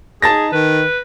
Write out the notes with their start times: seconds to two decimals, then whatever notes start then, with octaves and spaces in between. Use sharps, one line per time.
0.22 D#4 G#4 A5 A6 A#6
0.53 D#3 B4